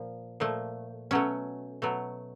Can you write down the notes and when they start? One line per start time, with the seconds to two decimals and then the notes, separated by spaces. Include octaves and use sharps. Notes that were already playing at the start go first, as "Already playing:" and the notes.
Already playing: A#2 F3
0.40 A#2 F3 A3
1.11 B2 F#3 A3 C#4
1.82 B2 F#3 A3